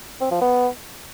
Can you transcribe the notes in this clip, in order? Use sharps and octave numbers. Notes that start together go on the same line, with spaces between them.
C4
F3
B3